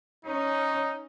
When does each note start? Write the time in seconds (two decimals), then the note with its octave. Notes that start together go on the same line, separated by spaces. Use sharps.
0.25 C#4 D#4